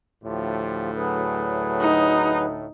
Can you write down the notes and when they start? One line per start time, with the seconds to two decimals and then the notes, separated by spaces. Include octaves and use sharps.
0.24 D2 A2 F3 F4 G4
0.96 F#3 G#4 B4
1.81 D#4